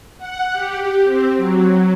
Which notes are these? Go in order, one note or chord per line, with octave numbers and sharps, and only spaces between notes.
F#5
G4
C4
F#3